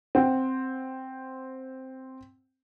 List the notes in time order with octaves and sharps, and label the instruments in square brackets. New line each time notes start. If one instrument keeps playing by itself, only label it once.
[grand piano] C4 F#5 G5